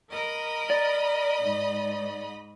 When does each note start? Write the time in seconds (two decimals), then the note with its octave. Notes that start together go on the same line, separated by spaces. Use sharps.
0.10 A#4 D#5 B5
0.70 D5
1.43 G#2